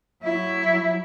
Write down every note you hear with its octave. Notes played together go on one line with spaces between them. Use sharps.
F#3 E4